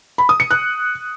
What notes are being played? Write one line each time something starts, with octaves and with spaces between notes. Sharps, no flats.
B5
D#6
C#7
F#6